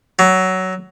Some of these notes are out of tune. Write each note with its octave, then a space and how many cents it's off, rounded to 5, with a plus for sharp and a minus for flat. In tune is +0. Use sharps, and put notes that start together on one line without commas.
F#3 +15